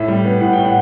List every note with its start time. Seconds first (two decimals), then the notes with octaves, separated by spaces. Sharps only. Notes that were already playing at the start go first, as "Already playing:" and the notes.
Already playing: A2 E5
0.08 G3
0.25 B3
0.41 A2 F#5
0.53 A2 G5
0.65 F#5